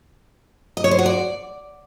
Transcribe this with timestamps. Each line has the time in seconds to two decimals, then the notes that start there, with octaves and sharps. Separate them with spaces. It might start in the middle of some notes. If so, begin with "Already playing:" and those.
0.77 D#5
0.84 C#5
0.91 C5
0.99 F#4
1.06 D5